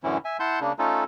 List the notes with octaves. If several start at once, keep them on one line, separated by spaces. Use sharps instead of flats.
F#2 A2 D3 E3 C#4 E4
E5 G#5
E4 F#5 A5 C6 G6
C#3 A#3 D4
A3 C#4 D#4 F4 A4